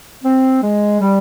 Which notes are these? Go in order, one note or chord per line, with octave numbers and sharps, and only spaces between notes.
C4
G#3
G3